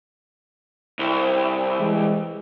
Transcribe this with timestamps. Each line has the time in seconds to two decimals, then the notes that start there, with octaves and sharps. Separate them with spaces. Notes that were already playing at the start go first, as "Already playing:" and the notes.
0.99 C2
1.79 E3 G#3